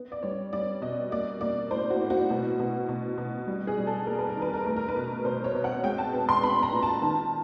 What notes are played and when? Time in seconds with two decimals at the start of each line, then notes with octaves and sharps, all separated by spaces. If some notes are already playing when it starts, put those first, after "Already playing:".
Already playing: B3
0.12 D5
0.23 G3 C#5
0.53 G3 D5
0.82 B2 D#5
1.11 A#3 D5
1.41 A#3 D5
1.71 A2 C5
1.90 F#4
2.01 A2
2.10 F#4
2.30 B2
2.59 B2
2.89 B2
3.18 B2
3.47 G3
3.67 G#4
3.78 G3
3.87 A4
4.06 A#3 A#4
4.18 B4
4.30 A#4
4.36 D#3
4.42 B4
4.54 A#4
4.65 A3 B4
4.76 A#4
4.88 B4
4.96 B2 A#4
5.25 B2 C5
5.44 C#5
5.55 B2
5.64 F#5
5.83 G#3 G5
5.98 A5
6.13 B3
6.29 C6
6.43 B3 B5
6.63 A#5
6.73 A#2
6.83 A5
7.02 D#3